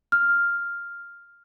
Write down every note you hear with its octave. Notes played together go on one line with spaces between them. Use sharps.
F6